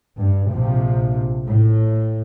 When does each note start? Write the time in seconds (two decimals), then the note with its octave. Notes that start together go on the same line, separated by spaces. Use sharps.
0.20 G2
0.53 A#1 C3 F3
1.46 A2